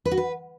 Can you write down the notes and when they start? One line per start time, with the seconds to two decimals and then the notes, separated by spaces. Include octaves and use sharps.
0.05 B4
0.11 F#4
0.17 B4